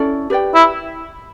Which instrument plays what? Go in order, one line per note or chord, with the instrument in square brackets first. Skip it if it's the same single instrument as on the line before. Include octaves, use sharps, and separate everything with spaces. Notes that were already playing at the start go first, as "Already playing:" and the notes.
Already playing: [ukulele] C#4 E4 A4 D5
G4 B4 D5 G5
[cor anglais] E4